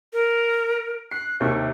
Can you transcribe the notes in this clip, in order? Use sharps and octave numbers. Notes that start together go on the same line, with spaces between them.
A#4
F#6 C7
D#2 C3 C#6